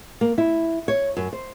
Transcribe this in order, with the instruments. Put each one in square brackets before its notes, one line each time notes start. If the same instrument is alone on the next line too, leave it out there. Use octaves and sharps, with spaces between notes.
[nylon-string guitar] A#3
E4
C#5
F#2
C5